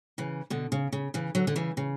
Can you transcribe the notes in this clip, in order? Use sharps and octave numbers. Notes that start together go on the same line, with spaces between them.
C#3 E3
B2 D3
C#3
C#3
C#3 E3
D3 F#3
D3
C#3 E3
C#3